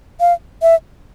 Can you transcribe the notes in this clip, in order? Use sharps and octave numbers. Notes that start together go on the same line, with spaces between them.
F5
E5